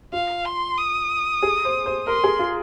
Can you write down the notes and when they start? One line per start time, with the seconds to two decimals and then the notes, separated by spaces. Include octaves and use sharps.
0.13 F4 F5
0.45 C6
0.78 D#6
1.43 G#4
1.65 C5
1.86 C5
2.07 A#4 C6
2.24 G#4
2.39 F4